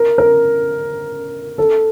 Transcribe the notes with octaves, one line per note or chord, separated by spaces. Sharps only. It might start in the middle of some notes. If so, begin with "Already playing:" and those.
Already playing: A#4
A#4
A4